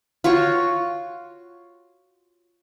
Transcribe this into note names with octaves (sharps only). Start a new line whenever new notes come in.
F4 F#4 C#5 C#6